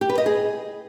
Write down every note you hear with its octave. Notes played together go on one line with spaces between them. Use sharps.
G4
B4
D#5
G#4